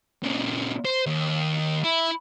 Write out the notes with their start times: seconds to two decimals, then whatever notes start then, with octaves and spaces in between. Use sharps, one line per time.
0.23 A#2 C#3
0.85 C5
1.06 D#2
1.84 E4